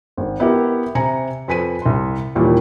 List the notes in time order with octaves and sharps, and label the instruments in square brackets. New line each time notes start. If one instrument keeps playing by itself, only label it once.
[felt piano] G#1
B3 E4 G4 A#4
C3 G#5 A#5 C#7
F2 B4 G#5 B6 D#7
C2 C6
D#2 A#2 E3 G3